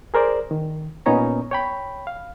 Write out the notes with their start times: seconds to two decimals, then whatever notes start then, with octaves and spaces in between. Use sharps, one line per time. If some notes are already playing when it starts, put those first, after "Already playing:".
0.14 G#4 A#4 C5 D5
0.51 D#3
1.06 A#2 B3 C#4 D#4 C#5 A#5
1.51 C#5 G5 B5
2.07 F5